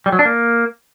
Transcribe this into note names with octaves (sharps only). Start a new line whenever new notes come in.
G3
F#3
D4
A#3